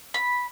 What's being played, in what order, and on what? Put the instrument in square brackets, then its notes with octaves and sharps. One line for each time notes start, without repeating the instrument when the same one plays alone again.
[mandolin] B5